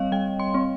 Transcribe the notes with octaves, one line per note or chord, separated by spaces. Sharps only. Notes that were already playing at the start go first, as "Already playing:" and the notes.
Already playing: G3 C4 C#5 D#5 F5
G3 G5
C6
C4